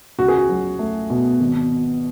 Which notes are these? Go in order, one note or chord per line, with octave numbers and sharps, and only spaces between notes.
C#2 F#4
G#4
F#4
F#3
A3
B2
G#1